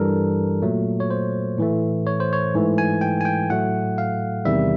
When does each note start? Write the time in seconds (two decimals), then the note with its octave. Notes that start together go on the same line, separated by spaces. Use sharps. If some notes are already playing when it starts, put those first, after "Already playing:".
Already playing: G2 E3 G3 A4 A#4
0.62 A#2 F#3 A3
1.00 C#5
1.11 C5
1.58 A2 E3 A3
2.07 C#5
2.20 C5
2.33 C#5
2.55 G#2 E3 A3
2.78 G#5
3.01 G5
3.21 G#5
3.25 G5
3.50 A2 F#3 A3 F#5
3.98 F5
4.45 E2 C3 D#3 G3 E5